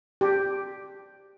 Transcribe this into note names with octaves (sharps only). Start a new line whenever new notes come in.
G4